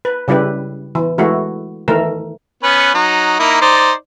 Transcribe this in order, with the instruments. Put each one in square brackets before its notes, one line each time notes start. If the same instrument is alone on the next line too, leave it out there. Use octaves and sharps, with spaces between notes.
[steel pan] B4
C#3 G3 E4 G4 B4
E3
E3 G#3 A3 E4 F#4
D#3 E3 A3 A#4
[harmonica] B3 C#4 B4
F#3 D#4
A#3 D#4 E4
D#4 C5 D5